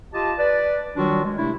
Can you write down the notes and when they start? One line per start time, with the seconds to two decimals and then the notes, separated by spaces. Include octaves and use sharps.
0.13 F4 G4 D#5 A5
0.39 B4 D5
0.96 D#3 F#3 G3 D4 F4 F#4
1.25 G#3
1.38 C3 A3 D4 E4